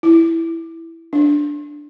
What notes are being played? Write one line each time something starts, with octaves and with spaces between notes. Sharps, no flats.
E4
D4